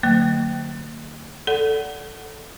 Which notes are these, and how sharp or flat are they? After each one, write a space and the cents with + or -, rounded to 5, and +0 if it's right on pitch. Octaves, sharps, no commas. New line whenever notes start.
D3 +35 F#3 +0 A#3 -35
A4 +0 D5 -25 F#5 +10